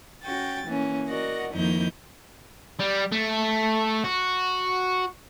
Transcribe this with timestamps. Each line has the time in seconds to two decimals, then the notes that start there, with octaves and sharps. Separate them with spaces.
0.23 C#4 F#4 G5 A6
0.67 E3 A#3 C#4
1.08 F#4 A#4 D5 D#5 F#5
1.54 F2 D#3 A#3 D#4 E4 G6
2.80 G3
3.12 A3
4.04 F#4